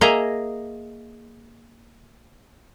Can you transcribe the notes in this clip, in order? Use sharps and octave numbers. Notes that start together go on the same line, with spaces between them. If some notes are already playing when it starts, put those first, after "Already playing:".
A#3 G#4 D#5 E5 G#5 A#5